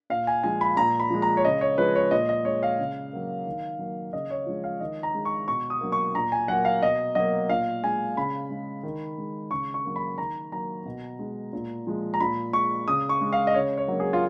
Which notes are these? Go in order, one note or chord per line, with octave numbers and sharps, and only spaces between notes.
A#2 F5
G#5
F3 G#3 G#5
B5
A#2 A#5
B5
F3 G#3
A#5
C#5
C#3 D#5
C#5
F3 G#3 B4
C#5
A#2 D#5
D#5
G#3 C#5
F5
C#3
F#3 A#3
D#3
F#3 A#3
C#3 D#5
C#5
F3 G#3
F5
D#3 D#5
A#5
G#3
C#6
B2 C#6
D#6
F#3 A#3
C#6
A#2 A#5
G#5
F#3 A#3 F#5
F5
B2 D#5
F#3 A#3 D#5
A#2 F5
G#3 G#5
C#3 B5
G#3
D#3
G#3
C#3 C#6
C#6
F#3 A#3
B5
D#3 A#5
F#3 A#3 A#5
B2
G#3
A#2
F3 G#3
A#5
A#2 B5
G#3 C#6
C#3 D#6
C#6
G#3
F5
D#5
C#3 C#5
C#5
F#3 A#3
G#4
F4